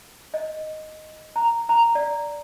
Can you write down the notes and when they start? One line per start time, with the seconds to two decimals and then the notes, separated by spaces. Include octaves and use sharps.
0.34 D#5
1.36 A#5
1.69 A#5
1.95 D5